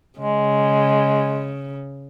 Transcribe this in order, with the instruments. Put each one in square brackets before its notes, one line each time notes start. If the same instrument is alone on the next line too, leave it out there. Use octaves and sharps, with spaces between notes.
[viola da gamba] C#3 [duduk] G#3